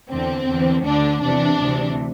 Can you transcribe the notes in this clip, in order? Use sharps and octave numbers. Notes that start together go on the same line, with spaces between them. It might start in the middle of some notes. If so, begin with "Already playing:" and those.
E2 D3 C4
E2 D3
D2 D3 D4
E2 C3 E3 D4
D2 C3 E3